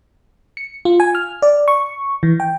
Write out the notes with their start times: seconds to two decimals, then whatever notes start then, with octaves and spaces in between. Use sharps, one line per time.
0.57 C#7
0.85 F4
1.00 G#5
1.15 F6
1.42 D5
1.68 C#6
2.23 E3
2.40 G5